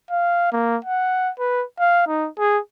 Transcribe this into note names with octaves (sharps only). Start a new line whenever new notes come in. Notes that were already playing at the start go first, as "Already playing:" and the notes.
F5
A#3
F#5
B4
F5
D#4
G#4